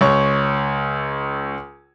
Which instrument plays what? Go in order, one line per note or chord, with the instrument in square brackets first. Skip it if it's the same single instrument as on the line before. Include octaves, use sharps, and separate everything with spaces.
[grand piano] C#2 C#5 C#6